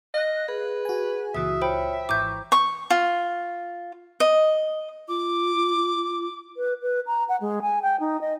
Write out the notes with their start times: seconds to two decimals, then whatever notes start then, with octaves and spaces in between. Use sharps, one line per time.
0.14 D#5 F5 F#6
0.48 G#4 B4
0.85 F#4 G#5
1.35 C#2 A#2 E3 F#4 E5 D#6
1.62 F4 C5 C#5 G5 B5
2.09 G#1 E3 A#5 C#6 D6 G6
2.52 C#6
2.90 F4
4.20 D#5
5.08 F4 D6
6.57 B4
6.82 B4
7.06 A#5
7.29 F#5
7.41 G#3
7.62 G#5
7.82 G5
8.00 D#4
8.21 D#5